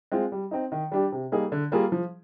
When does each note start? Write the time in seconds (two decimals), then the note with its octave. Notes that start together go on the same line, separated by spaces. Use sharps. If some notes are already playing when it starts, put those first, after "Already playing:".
0.12 G#3 C4 F4
0.32 G3
0.51 C4 D#4
0.72 D#3
0.91 G3 D4 G4
1.12 C3
1.32 G3 A#3 D#4 G#4
1.52 D3
1.72 G3 A#3 F4 G#4
1.92 F3